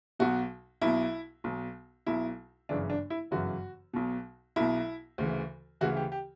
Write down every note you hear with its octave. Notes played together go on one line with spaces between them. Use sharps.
B1 B2 F#4
B1 B2 E4
B1 B2
B1 B2 E4
G1 F#2 C#3 E3 D4
D4
E4
G1 F#2 C#3 E3 F#4
B1 B2
B1 B2 E4
D2 C#3 E3
D2 C#3 E3 F#4
G4
G4